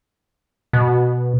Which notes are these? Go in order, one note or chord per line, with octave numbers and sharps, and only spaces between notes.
B2